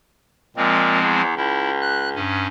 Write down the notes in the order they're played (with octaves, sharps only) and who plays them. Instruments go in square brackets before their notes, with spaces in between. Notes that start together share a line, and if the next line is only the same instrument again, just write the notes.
[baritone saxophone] A#2 [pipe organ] F3 G#3 C4
[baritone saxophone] E2
[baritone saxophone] C#2 [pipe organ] E4
[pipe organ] F#6
G2 C#4